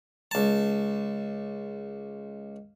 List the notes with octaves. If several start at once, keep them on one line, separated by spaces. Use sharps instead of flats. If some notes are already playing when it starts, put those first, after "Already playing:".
C#2 A5